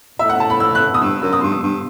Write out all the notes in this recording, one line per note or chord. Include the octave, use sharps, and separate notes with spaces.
A2 E5
F#5
A5
B5
E6
F#6
D#6
G2 E6
F#2 E6
D#6
G2 C6
D#6
G2